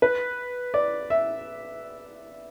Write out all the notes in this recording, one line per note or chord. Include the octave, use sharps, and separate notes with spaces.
B4
D5
E5